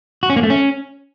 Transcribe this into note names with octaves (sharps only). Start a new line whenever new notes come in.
F#4
C#4
A#3
A3
C#4